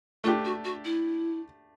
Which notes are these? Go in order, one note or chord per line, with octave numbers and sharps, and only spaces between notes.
A3 D4 F4 G4
F#4
F#4
E4